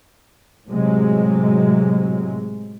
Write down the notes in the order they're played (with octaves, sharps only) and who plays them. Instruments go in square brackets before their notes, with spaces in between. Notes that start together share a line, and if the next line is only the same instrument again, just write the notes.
[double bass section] A2 C3 F#3 G#3